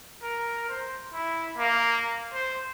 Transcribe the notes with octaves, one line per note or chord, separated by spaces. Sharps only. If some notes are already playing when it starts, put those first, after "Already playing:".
A#4
C5
E4
A#3
C5